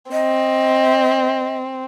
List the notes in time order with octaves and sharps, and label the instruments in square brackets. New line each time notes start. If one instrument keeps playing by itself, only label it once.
[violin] C4 [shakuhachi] D#5